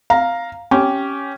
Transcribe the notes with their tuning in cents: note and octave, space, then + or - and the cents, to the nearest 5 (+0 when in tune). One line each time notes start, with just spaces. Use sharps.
F5 +0 A#5 +0
C#4 +0 G4 -15